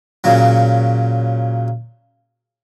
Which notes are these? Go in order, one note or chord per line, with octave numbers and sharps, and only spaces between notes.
A#2 C#3 F#3